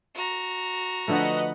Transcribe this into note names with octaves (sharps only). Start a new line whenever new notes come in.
F#4 A#5
D3 F3 A3 B4 D#5 F#5